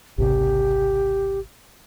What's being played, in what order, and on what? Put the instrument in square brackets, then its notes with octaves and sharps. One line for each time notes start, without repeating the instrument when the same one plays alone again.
[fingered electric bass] G#1 C#2 C3 [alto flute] G4